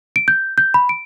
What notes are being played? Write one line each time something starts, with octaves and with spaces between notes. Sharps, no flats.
D7
G6
G6
B5
D7